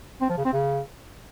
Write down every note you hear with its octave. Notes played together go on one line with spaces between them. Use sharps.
C4
F3
C#3
C4
C#3